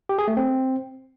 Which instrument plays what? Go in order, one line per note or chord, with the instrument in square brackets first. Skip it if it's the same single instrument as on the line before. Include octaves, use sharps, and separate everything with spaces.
[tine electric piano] G4
G#4
A3
C4